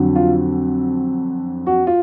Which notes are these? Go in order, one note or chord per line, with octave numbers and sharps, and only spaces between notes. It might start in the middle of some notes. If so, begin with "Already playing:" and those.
Already playing: F2 D3 F#3
F4
F#4
F4